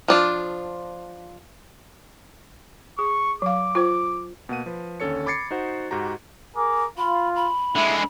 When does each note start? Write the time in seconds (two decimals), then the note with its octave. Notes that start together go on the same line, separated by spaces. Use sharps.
0.08 F3 D4 F4
2.99 G#4 C#6
3.42 F#3 F5 D6
3.75 F4 C5
4.49 B2 A#3 F#5 D#7
4.66 F3 B4
5.00 D#2 D3 C#4 A4 C#5 C#7
5.26 B5 D6 G#6 A6 C7 C#7
5.51 D#4 F#4 C5 F#5
5.91 G#2 F#4 G4 A#5
6.56 G#4 A#4 D6
6.98 F4 B5
7.36 B5
7.75 D3 G#3 E4